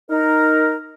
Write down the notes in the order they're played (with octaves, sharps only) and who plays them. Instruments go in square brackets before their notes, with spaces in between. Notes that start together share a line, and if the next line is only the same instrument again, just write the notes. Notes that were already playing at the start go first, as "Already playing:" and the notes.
[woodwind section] D#4 A#4